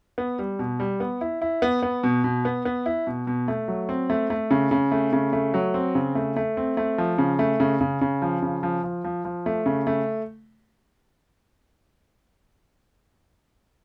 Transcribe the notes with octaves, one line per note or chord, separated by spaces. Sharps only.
B3
G3
B2
G3
B3
E4
E4
B3
B3
B2
B2
B3
B3
E4
B2
B2
A3
F#3
C4
A3
A3
C#3
C#3
A3
C#3
A3
F#3
C4
C#3
A3
A3
C4
A3
F3
C#3
A3
C#3
C#3
C#3
F3
C#3
F3
F3
F3
F3
A3
C#3
A3